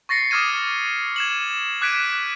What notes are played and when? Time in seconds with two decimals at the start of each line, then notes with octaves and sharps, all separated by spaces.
0.09 C#6 A6 A#6 C7 C#7
0.31 D6 D#6 F6 G#6 D#7
1.16 G#6 E7 F#7
1.82 D6 F#6 G#6 B6 D7 D#7